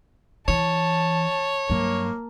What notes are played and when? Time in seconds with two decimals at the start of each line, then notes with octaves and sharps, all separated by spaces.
0.48 E3 C#5 A5
1.70 G2 F#3 A#3